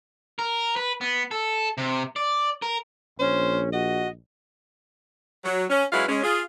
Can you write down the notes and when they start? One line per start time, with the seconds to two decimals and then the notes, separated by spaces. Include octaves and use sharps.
0.39 A#4
0.76 B4
1.01 B3
1.31 A4
1.78 C3
2.16 D5
2.62 A#4
3.19 A#1 C#4 C5
3.73 F#4 D#5
5.44 F#3
5.70 C#4
5.92 F#3 G#3 C#4 E4 B4 F5
6.08 G#3 C#4
6.23 F4 G#4